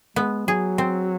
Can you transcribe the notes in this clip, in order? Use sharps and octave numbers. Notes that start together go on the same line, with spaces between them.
G#3 B3
F#3 G#4
C4